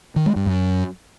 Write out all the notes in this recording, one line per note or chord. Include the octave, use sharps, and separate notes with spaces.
D#3
G#3
G2
F#2